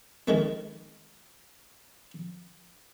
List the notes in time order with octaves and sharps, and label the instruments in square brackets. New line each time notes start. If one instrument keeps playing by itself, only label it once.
[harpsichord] D#3 G#3 A3 C4